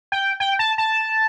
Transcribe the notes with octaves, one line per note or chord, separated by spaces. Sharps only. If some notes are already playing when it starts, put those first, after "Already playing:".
G5
G5
A5
A5